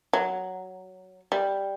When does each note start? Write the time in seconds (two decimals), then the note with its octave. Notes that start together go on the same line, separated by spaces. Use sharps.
0.13 F#3
1.32 G3